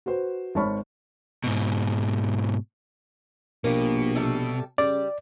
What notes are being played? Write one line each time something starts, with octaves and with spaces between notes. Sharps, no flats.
F#4 B4 C5
G#1 C#5 A5 B5 C#6 F6
G#2 B2
A#1 B2 A#3 G4
C3 G3 A4
C#3 G3 D5